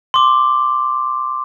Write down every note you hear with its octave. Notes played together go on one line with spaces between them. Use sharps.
C6 D6